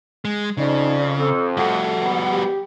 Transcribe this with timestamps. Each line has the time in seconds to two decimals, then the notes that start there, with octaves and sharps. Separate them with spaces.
0.25 G#3
0.57 F2 C#3 D#4 D5
1.17 F2 C4 A4
1.57 G3 A3 F#4 F#5
2.00 G#1 B3
2.32 G4